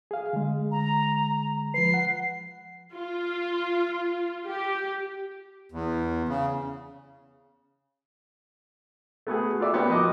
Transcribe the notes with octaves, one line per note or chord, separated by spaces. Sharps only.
G#4 F5
D3 G#3
A#5
F3 B4 C7
F#5
F4
G4
E2
C#3
A3 B3 F#4 G#4
F4 A4 D5 E5
A#3 B3 C#4 F#4 G4
F3 D#5 D6